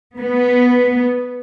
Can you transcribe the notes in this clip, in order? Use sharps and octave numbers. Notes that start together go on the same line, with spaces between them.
B3